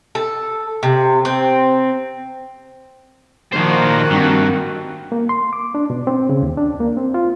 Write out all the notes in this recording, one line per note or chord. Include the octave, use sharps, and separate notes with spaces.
A4
C3
C4
A#2 D#3 F3 A#3 D#4 F#4 C5
G2 C4
A#3
C6
D6
D4
B2
C4
C#3
D#2
D4
A#3
C4
F4